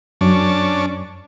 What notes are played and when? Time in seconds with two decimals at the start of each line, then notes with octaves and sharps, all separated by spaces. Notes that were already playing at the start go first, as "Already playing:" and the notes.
0.21 F#2 C#4 D4 A5